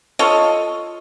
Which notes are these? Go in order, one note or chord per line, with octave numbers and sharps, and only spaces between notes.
F4 A4 C#5 D#5